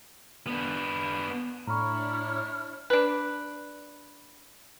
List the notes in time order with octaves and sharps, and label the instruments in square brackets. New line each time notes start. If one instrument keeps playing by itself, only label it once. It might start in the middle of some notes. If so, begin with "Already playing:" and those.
[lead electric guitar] B3 D4
[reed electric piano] A2 [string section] D4 E4 C#5 [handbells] A#5 B5 C#6 [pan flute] F6
[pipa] D4 B4